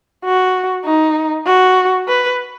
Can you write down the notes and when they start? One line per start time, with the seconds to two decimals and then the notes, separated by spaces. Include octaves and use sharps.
0.25 F#4
0.85 D#4
1.46 F#4
2.08 B4